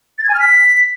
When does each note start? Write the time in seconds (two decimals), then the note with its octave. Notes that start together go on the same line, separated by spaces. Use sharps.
0.18 A6
0.24 G#6
0.29 G#5
0.34 F6
0.40 B6